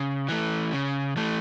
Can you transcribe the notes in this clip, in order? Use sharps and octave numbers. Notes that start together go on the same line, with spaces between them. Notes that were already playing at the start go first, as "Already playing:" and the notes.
Already playing: C#3
E3 A3
C#3
E3 A3